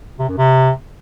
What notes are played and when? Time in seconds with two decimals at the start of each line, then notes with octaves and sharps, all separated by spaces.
0.19 C3
0.28 F#2
0.38 C3